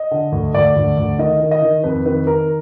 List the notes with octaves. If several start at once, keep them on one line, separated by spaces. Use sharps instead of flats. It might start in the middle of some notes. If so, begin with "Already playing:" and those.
Already playing: D#5
D3
D2
D2 D5
D2
D2
D#3 D#5
D#3
D#5
D#3
F2 B4
D#3 B4
D#3 A#4